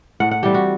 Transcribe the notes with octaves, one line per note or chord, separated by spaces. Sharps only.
A2 F#5
F#5
E3 G3 C4 G4
F#4